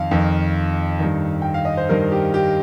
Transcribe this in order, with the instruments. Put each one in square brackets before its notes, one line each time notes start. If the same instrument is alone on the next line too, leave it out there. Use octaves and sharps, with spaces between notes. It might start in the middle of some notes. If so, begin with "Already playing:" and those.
Already playing: [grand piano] F2 D#3 F5
F2 D#3
G2 D#3
G5
F5
D#5
C5
G2 D#3 A#4
G4
G4